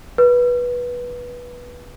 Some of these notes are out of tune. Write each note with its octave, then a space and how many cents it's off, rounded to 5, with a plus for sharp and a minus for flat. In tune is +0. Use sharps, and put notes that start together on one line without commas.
B4 -15